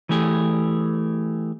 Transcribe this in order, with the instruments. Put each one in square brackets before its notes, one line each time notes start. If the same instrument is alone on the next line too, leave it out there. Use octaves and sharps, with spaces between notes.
[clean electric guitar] E3 A3 G4 G#4